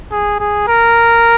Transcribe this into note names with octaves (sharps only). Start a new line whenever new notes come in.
G#4
G#4
A#4